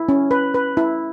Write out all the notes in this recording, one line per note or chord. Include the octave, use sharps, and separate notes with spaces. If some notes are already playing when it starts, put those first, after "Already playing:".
Already playing: E4
C#4
B4
B4
E4